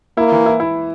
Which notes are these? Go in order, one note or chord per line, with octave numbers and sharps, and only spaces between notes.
A#3 E4
E3
E4
E4